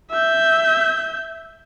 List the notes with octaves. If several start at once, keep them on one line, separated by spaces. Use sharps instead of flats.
E5 G6